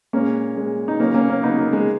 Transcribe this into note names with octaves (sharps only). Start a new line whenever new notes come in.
A#2 G#3 A#3 C#4
A#2 G#3
D#4
C#3 F#3 A#3 C#4
A#3 C#4
A#3 C#4
C#3 F#3 B3 D#4
A#3
G#3